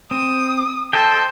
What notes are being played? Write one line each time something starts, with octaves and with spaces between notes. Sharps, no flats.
C4 D#6
A4 C5 D#5 G5